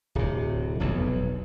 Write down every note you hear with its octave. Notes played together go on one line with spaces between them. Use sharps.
D1 C3
F1 B1 E2